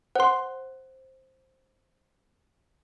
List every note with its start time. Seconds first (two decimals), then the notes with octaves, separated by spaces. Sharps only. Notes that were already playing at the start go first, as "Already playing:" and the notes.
0.15 C5 F#5 C6